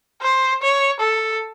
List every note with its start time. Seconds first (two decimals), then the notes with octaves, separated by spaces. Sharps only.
0.22 C5
0.62 C#5
1.00 A4